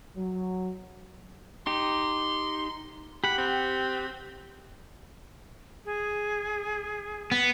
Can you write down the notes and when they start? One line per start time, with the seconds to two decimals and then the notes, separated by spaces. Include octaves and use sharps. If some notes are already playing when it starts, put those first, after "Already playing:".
0.17 F#3
1.67 D#4 G4 C6
3.24 G4 F#5 B5
3.38 C4
5.85 G#4
7.31 B3